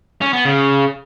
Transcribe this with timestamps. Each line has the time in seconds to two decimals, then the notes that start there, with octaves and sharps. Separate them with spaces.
0.21 C#4
0.33 B3
0.45 C#3